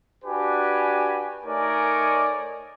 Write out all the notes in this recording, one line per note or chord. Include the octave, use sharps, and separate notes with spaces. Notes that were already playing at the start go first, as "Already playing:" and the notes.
D4 F#4 G4 B4 G#5
A3 D#4 A#4 C#5 D5 G#5